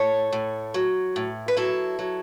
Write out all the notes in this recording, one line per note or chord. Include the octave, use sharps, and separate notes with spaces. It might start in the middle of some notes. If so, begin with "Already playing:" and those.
Already playing: A2 A4 C#5
A2
F#3
A2
B4
F#3 E4 A4
F#3